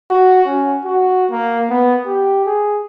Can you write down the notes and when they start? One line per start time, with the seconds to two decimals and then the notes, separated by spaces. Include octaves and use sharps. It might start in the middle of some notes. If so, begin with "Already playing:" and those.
0.10 F#4
0.47 C#4
0.85 F#4
1.31 A#3
1.69 B3
2.06 G4
2.46 G#4